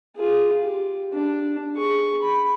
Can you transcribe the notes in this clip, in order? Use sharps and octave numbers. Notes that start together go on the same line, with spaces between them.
F4 G#4
G4
D4
G#4 C#6
B5